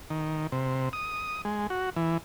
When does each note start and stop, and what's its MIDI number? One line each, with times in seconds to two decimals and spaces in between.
0.10 0.47 51
0.52 0.89 48
0.93 1.42 87
1.45 1.67 56
1.70 1.90 66
1.96 2.18 52